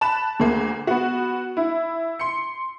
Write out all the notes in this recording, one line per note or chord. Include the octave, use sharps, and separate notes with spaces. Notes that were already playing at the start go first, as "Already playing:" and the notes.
A5 B5 F#6 E7
D2 A#3 G#4
B3 F#4
E4
C6 C#7